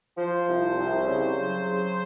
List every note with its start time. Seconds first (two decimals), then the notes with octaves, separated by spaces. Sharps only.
0.17 F3 C5
0.47 C2
0.77 C2
1.06 C#3
1.37 F#3
1.65 C#3